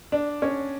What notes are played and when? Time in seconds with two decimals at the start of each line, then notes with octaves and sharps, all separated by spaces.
0.12 D4
0.42 C#4